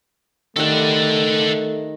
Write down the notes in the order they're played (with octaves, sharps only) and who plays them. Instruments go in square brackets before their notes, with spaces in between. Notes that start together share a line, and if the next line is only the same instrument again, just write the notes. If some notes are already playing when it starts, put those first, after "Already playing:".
[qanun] D#3 G3 D#4 [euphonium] A3 [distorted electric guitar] A4 F#5